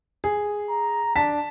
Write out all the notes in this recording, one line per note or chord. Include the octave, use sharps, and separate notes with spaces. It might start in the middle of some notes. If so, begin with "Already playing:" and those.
G#4
A#5
D4 A5 B6